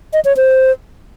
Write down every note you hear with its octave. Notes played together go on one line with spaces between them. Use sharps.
D#5
C#5
C5